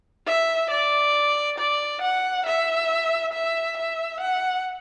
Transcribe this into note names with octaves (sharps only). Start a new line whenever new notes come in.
E5
D5
D5
F#5
E5
E5
E5
F#5